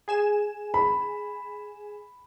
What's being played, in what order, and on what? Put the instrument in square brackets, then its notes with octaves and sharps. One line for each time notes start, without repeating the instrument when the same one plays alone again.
[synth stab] G#4 G#5 E7
[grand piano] B5